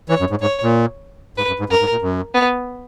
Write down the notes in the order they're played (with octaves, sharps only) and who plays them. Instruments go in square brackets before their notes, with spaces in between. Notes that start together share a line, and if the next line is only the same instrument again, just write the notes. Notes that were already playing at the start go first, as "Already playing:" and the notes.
[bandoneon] E3 [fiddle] C#5
[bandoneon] F#2
G#2
[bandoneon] G#2 [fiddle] C#5
[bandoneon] A#2
[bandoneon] G#2 [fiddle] B4
[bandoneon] F#2
G#2
[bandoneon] F#2 [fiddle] A#4
[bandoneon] G#2
A#2
F#2
[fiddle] B3